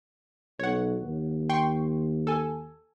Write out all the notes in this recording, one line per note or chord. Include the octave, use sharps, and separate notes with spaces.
B1 C#5 F#5
D#2
G5 C6 C#6
A4 G#5